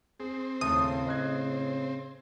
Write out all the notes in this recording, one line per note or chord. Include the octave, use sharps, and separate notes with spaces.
C4 G#4
D#2 A2 C#3 A3 C5 D#6
D#5 F#6 G#6